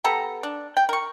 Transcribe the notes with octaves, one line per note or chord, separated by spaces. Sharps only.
B3 G4 A4 A#5
D4
G5
A#4 C#6